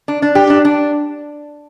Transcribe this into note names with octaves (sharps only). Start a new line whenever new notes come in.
D4
D4
G4
D4
D4